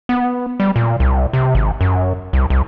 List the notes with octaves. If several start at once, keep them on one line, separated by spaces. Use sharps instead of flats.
B3
G3
A#2
C2
C3
G#1
F#2
C2
C2